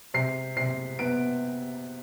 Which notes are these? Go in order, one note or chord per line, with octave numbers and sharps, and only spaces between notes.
C3 C7
C3 C7
B3 D7